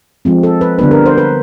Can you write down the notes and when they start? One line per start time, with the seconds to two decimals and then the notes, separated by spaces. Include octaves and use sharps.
0.25 F3 G#3 C4
0.43 A4
0.61 B4
0.78 D3 G3 B3 D4 B4
0.91 A#4
1.06 C5
1.18 B4